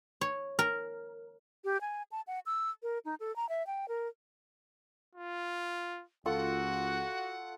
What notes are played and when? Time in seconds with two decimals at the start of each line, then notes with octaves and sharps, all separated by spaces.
0.21 C#5
0.59 A#4
1.64 G4
1.81 G#5
2.12 A5
2.27 F#5
2.46 E6
2.83 A#4
3.05 D#4
3.20 A4
3.36 A#5
3.49 E5
3.67 G5
3.88 A#4
5.15 F4
6.26 C#2 F4 F#4 A4 F#5 C#6